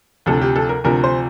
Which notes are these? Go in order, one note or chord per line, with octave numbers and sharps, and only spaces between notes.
D2 C3 F3 A4
G4
A4
A#4
D2 C3 F3 A#4
C5